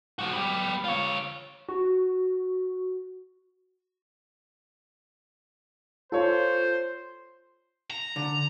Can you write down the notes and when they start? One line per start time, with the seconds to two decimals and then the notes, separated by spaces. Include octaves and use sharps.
0.19 F3 F#4
0.33 B3 G4
0.85 F4 C#5
1.69 F#4
6.12 F4 A4 C5 C#5
7.91 A#5
8.16 D3